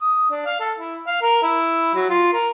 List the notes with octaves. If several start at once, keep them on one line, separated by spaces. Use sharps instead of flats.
D#6
D4
F5
A4
E4
F5
A#4
E4
F#3
F4
A#4